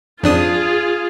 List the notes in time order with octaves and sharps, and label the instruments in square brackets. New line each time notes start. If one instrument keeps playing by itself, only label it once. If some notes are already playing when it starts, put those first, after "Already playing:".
[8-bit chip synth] F2 D4 D#6 [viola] F4 G#4